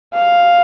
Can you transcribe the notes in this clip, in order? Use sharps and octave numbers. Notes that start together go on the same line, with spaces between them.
F5